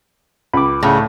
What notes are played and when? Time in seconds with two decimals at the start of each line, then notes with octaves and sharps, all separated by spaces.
0.54 C#2 B5 D6
0.83 A2 C#3